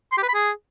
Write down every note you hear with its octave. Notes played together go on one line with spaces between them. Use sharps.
C6
G4
B4
B5
G#4